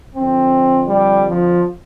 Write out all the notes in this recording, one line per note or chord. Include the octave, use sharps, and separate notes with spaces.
F2 D3 C4
G3
F3